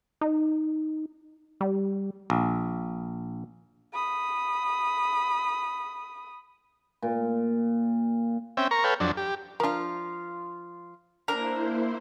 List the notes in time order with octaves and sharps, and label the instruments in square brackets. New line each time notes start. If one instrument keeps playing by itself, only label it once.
[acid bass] D#4
G3
[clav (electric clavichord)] A#1
[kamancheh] B5 D#6
[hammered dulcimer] A#2
[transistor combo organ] C4 C#4 E5 G5
A#4 A#5 C#6
A4 B4 C#5 F5 G5
F2 F#3 D4
G4
[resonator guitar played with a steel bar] F3 F4 [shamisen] D4 A#4
[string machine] A#3 E4 C5 [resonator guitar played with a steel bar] D4 [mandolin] A#4